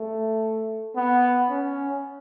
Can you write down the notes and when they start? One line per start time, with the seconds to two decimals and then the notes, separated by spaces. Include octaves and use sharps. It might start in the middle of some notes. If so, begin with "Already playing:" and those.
Already playing: A3
0.96 B3
1.50 C#4